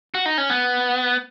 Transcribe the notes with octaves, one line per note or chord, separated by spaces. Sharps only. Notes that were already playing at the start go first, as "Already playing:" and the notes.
F#4
D#4
C#4
B3